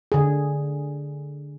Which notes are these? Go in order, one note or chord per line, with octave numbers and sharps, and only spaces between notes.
D3 G#4